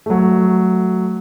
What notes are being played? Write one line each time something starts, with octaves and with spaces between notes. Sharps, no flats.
F#3 A3